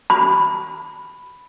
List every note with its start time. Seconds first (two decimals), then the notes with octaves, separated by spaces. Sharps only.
0.10 B5